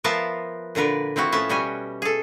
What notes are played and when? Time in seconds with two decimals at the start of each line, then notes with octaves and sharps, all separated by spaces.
0.04 F3 B3 F4 A#4 E5 A5
0.75 A#2 D3 A#4 B4 D5
1.16 F3 C4 E4 F#4
1.32 A2 F3 B3 C#4 E5 A5
1.49 B2 G3 C#4 F#4 G#5
2.02 G#4 A4